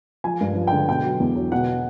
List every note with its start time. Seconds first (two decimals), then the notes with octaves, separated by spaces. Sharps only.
0.24 F3 G#5
0.41 G2
0.56 F3
0.67 G5
0.73 D3
0.89 B2 G5
1.04 F#3
1.20 E2
1.35 F#3
1.52 B2 F#5